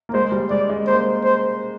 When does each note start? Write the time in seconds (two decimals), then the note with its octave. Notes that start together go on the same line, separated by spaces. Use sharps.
0.09 A#3
0.14 G#3 C5
0.32 G3
0.50 G#3 D5
0.70 G#3
0.87 A#3 C5
1.24 C5